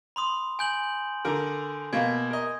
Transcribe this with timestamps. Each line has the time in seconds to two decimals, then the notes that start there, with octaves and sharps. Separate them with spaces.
0.16 B5 C6 D#6
0.59 G#5 G6 F#7
1.25 D3 A#4
1.93 B2 A#3 G#6
2.31 A#4 D#5